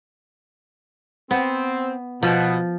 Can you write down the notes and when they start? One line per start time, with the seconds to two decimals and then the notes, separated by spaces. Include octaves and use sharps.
1.31 B3 C4
2.23 B2 F3